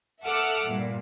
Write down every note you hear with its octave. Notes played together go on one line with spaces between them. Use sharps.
A4 E5 F#5 D6 E6 F6
G2 A#2